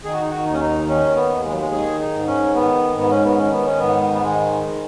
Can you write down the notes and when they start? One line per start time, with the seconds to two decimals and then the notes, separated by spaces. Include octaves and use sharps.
0.04 D#3 G#4
0.13 F#4
0.21 D#4
0.30 F#4
0.46 D#2 D#4
0.53 C#4
0.61 D#4
0.87 D#3 C#4
1.16 B3
1.30 D#2
1.44 G#3
1.51 F#3
1.58 G#3
1.71 D#3 G#4
1.99 D#4
2.13 G#2
2.27 C#4
2.54 D#3 B3
2.96 G#2 B3
3.10 C#4
3.24 B3
3.38 D#3 C#4
3.52 B3
3.65 C#4
3.79 G#2 B3
4.13 B3
4.22 D#3 G#3